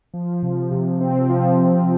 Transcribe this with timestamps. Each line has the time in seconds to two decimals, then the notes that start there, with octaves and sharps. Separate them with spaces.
0.14 F3
0.43 C3
0.71 C3
1.01 C4
1.30 F3